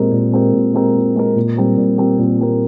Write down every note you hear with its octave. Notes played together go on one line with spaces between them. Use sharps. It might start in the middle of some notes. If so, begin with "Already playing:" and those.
Already playing: A#2 G#3 C4 G4 A#4
A#2
G#3 C4 G4 A#4
A#2
G#3 C4 G4 A#4
A#2
G#3 C4 G4 A#4
A#2
G3 C4 G4 A#4
A#2
G3 C4 G4 A#4
A#2
G3 C4 G4 A#4